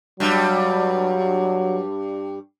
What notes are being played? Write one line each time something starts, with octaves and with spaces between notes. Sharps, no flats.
G2 F#3 G3